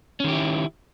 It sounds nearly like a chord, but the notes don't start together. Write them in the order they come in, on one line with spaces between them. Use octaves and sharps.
C#4 D#3 G4 E4